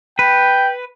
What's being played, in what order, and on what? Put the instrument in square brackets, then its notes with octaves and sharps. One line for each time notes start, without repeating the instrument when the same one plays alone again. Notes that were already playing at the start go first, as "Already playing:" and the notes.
[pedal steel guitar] B4 [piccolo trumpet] G5